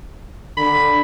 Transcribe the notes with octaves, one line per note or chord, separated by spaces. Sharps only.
D3 B5